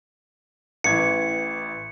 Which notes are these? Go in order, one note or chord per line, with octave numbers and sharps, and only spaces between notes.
A1 E3 G#6 C#7